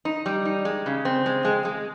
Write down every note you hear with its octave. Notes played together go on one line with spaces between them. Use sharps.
D#4
G3
D#4
G#3
C#3
C4
G#3
G#3
G#3